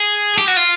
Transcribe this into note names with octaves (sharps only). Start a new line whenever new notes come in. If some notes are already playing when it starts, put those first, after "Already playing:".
Already playing: G#4
G4
F#4
F4